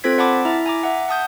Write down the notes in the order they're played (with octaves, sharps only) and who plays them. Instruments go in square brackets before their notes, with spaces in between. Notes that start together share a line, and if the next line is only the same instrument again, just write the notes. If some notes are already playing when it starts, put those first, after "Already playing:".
[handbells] C4 F4 A4 C5 G#6 B6
D5 F#5 A5 B5 D6
E4 E5 A#5
G#5 A#5 D6
E5 F#5
F#5 A5 D#6 G6